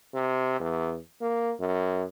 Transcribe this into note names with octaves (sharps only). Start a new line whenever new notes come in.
C3
E2
A#3
F#2